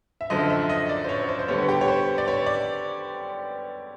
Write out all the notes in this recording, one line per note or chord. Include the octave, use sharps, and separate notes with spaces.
E5
F#2 D3 F3 D#5
E5
D#5
D5
C5
C#5
C5
C5
D3 G3 B3 C#5
G4
C#5
C5
D5
C#5
D5